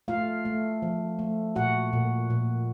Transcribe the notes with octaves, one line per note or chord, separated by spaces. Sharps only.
A3 F4 F5
A3
F3
A3
A#2 F#4 F#5
A#2
A#2